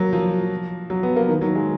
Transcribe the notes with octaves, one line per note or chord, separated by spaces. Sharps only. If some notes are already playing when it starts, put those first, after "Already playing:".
Already playing: F#3 A#3
F3
F#3
B3
A#3
D#3
F#3
G#3